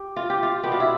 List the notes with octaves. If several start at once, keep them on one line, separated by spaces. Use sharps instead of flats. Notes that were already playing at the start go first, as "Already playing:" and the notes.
Already playing: G4
F4
G4
F4
B2 B3 D4 G4
F4
E4